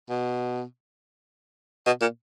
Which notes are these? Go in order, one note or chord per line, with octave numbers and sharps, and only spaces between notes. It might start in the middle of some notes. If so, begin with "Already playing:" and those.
B2
B2
A#2